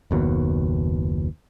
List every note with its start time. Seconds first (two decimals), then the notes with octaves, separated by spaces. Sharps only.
0.11 F#1 D#2 B2